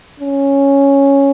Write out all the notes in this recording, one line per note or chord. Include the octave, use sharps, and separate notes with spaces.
C#4